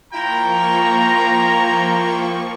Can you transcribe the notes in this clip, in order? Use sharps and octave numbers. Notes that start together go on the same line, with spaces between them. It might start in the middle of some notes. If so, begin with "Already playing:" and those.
F3 A#3 E4 F4 G5 A#5 C#6